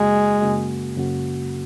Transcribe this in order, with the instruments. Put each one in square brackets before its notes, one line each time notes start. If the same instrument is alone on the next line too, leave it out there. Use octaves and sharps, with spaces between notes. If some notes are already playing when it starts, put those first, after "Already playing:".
Already playing: [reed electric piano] F#2 C#3 A#3 F#4 [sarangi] G#3
[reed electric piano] F#2 C#3 A#3 F#4
F#2 C#3 A#3 F#4